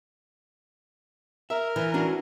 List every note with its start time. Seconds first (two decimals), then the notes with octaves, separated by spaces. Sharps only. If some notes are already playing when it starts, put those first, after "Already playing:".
1.50 A#4 E5
1.76 E3
1.94 C#4 D4 F#4